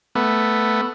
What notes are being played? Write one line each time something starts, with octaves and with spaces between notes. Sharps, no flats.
A3 B3